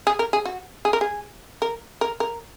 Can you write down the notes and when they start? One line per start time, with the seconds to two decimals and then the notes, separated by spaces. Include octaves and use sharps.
0.07 G#4
0.19 A#4
0.33 G#4
0.45 F#4
0.85 G#4
0.93 A#4
1.01 G#4
1.62 A#4
2.01 A#4
2.20 A#4